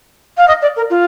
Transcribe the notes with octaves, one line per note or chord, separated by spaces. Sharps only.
F5
D#5
D5
A#4
F4